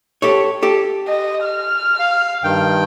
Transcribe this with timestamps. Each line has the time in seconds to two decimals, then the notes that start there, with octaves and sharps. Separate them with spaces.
0.22 G4 A4 C#5
0.63 G4 A4
1.08 D#5
1.45 F6
1.99 F5
2.44 G2 D#3 G5